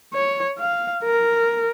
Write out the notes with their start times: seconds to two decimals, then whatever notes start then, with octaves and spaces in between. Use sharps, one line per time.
0.14 C#5
0.59 F5
1.04 A#4